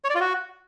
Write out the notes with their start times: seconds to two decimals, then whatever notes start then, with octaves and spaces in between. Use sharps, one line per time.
0.04 C#5
0.10 D5
0.15 F4
0.20 F#4